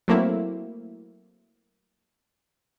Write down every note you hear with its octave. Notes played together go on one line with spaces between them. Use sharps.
F#3 A3 A#3 C4 E4